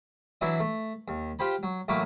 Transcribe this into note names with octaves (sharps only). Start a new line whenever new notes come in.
E3 F#3 D4 E4 F#4 E5
A3
D#2
F4 G4 C5 B5
F#3
A1 F#3 A3 A#3 B4 D6